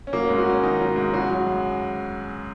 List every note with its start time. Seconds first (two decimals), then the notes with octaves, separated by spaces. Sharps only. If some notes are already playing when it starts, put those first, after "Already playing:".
0.07 C#4
0.13 F#3 A#3
0.25 G#2 C#4
0.38 F#4
0.46 G#2 C#4
0.63 D#3 D#4
0.80 F#3
0.96 G#2
1.13 C#3 F#4
1.30 F#3
1.47 F#2